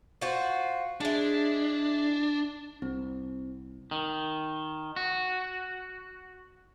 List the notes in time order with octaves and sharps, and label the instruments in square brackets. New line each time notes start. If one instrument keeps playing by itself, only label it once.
[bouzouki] F4 F#4 C5
[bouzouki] G#3 E4 [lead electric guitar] D4
[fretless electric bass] C2 [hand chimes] C4
[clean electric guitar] D#3
F#4